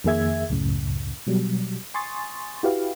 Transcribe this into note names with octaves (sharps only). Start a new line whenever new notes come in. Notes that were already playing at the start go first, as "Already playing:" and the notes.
F2 D#3 A#3 G#4 E5 G#6
C#2 F#2 A2 C#3
B2 F#3 G3
G#5 C6 C#6 D#6 A6
E4 F#4 G4 B4 F5